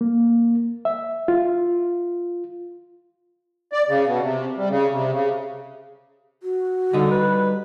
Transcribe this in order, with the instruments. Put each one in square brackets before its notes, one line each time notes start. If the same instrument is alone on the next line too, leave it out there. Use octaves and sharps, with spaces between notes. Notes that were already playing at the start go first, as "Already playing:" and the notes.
[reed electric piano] A#3
E5
F4
[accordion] D5
C#3
B2
C3
G3
C#3
C3
C#3
[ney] F#4
[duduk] D3 [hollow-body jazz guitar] G3 D#4
[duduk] B4